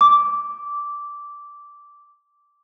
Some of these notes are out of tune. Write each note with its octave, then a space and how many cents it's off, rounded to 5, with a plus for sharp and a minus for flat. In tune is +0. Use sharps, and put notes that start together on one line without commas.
D6 -10